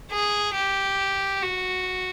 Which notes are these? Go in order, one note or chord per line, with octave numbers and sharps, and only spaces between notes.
G#4
G4
F#4